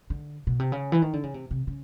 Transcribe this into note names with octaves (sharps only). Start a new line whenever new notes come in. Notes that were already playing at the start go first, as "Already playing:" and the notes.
D3
B2
C3
C#3
E3
D#3
D3
C#3
C3
C3
C#3